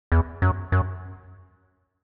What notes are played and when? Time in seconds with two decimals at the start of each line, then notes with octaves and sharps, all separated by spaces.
0.12 E2
0.42 F#2
0.72 F#2